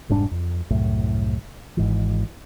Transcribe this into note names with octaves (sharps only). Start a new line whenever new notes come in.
F1 G#2 G3 D4
F2
C2 F#2 A2
G#1 G#2 E3